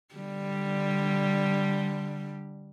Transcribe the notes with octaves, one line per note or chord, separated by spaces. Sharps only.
D3 G3